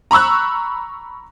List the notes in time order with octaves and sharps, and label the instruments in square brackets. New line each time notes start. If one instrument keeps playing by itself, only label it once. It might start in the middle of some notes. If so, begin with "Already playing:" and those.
[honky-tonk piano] A#5 B5 C#6 E6 F#6